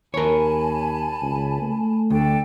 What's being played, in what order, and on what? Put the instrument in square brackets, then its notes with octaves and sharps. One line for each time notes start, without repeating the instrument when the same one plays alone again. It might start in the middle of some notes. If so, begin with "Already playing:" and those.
[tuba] D#2 [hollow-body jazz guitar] A#4 C#5 [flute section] G#5 A5 B5
[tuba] C#2
A3
[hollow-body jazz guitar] D2 [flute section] D4 A4 G5